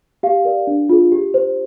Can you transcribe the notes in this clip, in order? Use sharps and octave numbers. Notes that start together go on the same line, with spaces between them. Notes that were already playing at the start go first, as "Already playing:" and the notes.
G4 F5
A#4 D5
D4
F4 G#4
G4
C5